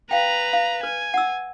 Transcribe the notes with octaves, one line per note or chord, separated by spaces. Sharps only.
B4 F5 G5 A#5
F5
B4 G#5
F#5 E6